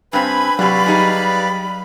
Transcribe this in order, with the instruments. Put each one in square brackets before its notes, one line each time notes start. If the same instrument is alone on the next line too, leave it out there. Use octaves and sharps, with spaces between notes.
[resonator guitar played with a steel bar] G2 C4 [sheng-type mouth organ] B4 G#5 [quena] B5
[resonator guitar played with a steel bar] C3 F#4 [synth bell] F#3 G4 [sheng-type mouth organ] B4 D5 F5
[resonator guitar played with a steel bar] G3 D#4 G#4